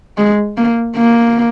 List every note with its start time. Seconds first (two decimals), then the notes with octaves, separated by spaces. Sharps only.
0.18 G#3
0.57 A#3
0.96 A#3